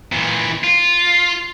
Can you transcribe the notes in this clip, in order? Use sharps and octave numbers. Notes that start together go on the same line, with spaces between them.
A#2 E3
F4